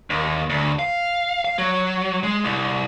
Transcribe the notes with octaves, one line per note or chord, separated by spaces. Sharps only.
D#2
D2
F5
F5
F#3
G#3
C2